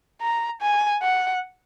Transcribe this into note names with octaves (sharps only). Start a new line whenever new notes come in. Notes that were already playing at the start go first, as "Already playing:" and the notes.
A#5
G#5
F#5